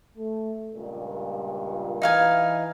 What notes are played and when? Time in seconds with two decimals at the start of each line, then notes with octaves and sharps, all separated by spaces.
0.17 A3
0.74 C#2 G2 A#2
2.02 E3 D#4 F5 G#5